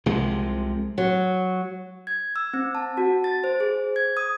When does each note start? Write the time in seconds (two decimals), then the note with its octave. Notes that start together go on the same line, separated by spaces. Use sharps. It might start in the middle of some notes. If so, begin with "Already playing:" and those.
0.06 C2 C3 F3 G#3
0.98 F#3
2.07 G#6
2.36 E6
2.54 C4
2.75 A5
2.97 F#4
3.24 A6
3.44 C5
3.60 G#4
3.96 G#6
4.17 D#6